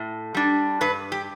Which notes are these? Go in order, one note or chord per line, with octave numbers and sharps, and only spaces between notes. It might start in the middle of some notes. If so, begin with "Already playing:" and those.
Already playing: A2
G3 D4
G2 B4
G4